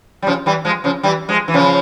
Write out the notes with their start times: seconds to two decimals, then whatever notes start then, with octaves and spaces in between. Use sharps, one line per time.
0.22 G3
0.27 C#3 F3
0.46 E3 G3
0.65 F3 G#3
0.84 C#3 F3
1.03 E3 G3
1.29 F3 G#3
1.48 E3
1.54 C#3 F3